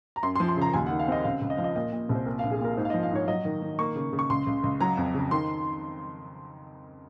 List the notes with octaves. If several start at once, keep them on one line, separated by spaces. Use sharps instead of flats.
A#5
F#2 C6
C6
F3
C6
C#3 A#5
D#2 G#5
F#5
D#3
F5
C4 D#5
C#2 F5
C#2
D#5
F3 F5
D#5
A#2 D#5
A#2
C2
C5
A#2 A#4
F5
A#1
G#4
A#2 A#4
G#2 C5
F5
D#5
F3
F5
G#2 C#5
F#3 D#5
D#3
D#3
A#3 C#6
C#3
C#3
C#6
C#2 C6
C#2
C#2
F#3 A#5
F2
C#3
D#3 C6